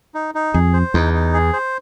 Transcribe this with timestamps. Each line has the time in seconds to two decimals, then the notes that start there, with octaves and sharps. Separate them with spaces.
0.14 D#4
0.35 D#4
0.54 F2 G#4
0.73 C5
0.94 E2 D#4
1.14 D#4
1.34 G#4
1.53 C5